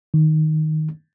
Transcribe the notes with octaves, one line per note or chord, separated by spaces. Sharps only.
D#3